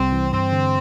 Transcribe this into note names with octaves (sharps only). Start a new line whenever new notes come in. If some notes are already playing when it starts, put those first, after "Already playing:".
Already playing: C2 C3 G3 C4
E3
G2 C4
D3